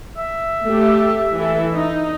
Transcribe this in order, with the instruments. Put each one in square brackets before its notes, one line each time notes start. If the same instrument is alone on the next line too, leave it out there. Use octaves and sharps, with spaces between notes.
[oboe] E5
[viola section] A3 G4
E3 E4 A4
D#4